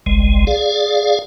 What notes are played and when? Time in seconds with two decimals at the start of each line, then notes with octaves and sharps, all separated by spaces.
0.06 G1 C2 G#3
0.47 G#4 D5 F5